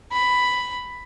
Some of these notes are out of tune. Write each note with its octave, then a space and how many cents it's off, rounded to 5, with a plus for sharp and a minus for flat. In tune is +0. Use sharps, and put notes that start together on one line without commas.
B5 +5